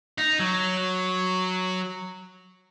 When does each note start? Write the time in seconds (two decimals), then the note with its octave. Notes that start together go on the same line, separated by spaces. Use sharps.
0.18 D#4
0.39 F#3